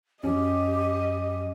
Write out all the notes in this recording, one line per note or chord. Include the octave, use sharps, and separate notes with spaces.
F#2 F#3 C#4 G4 D#5